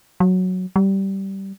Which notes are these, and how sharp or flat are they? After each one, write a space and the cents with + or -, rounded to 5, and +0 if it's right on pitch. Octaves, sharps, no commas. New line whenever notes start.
F#3 -5
G3 -15